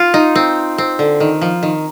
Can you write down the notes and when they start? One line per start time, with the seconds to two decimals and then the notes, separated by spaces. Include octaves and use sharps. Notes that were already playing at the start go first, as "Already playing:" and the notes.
Already playing: F4
0.14 D#4
0.35 C4
0.78 C4
0.99 D3
1.20 D#3
1.41 F3
1.63 D#3